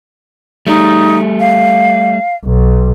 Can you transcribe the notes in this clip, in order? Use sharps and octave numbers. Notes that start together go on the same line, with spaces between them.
G3 A3 D#4
F5
B1